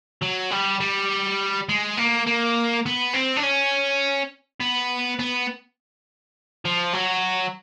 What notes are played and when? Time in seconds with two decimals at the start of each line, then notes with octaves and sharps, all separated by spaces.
0.22 F#3
0.51 G3
0.81 G3
1.69 G#3
1.97 A#3
2.26 A#3
2.86 B3
3.14 C4
3.37 D4
3.43 C#4
4.60 B3
5.19 B3
6.65 F3
6.93 F#3